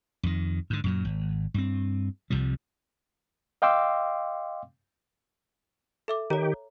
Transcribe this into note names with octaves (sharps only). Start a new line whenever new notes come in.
F2 D#3
G#2 D3
F#2 A#2 F#3
G#1
G2 C4
C2 C3 F3 G3
D#5 F5 G5 C6 D6 E6
A4 E5 D6
D#3 G4 C#5 A#5